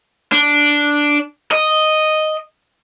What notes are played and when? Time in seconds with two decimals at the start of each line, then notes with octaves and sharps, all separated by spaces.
0.32 D4
1.52 D#5